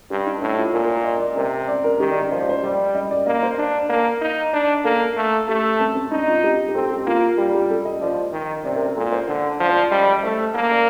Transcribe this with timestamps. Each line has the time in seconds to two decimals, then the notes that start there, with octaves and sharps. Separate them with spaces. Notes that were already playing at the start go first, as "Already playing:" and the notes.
0.10 G2 G4
0.26 D#4
0.42 A2 D4
0.57 F4
0.73 A#2 A#4
0.84 A#4
1.04 D#5
1.20 D5
1.36 C3 A#4
1.68 D5
1.84 A#4
1.99 D#3 G4
2.11 D5
2.21 D#5
2.32 F3 C5
2.40 D5
2.49 C5
2.63 G3 D5
2.95 D#5
3.11 D5
3.26 A#3 D#5
3.42 C5
3.58 D4
3.90 A#3 A#4
4.22 D#4
4.53 D4
4.84 A#3 A4
5.16 A3
5.48 A3 G4
5.80 C4
5.95 C4
6.11 D4 D#4
6.28 F4
6.44 G4
6.68 G4
6.75 C4 A4
6.91 G4
7.06 A#3 F4
7.38 G3 G4
7.54 G4
7.70 A4
7.85 D#5
8.01 F3 D5
8.33 D#3
8.65 C3 D5
8.75 A#4
8.86 A#4
8.96 A#2 A4
9.12 C5
9.28 D3
9.60 F3 D5
9.69 C5
9.76 D5
9.91 G3 D#5
10.02 D5
10.23 A3 C5
10.55 A#3 A#4
10.71 D5